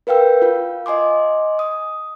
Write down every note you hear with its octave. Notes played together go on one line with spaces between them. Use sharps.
A#4 B4 F5 G5 E6
F4 F5
D#5 G#5 C6 D6
D#6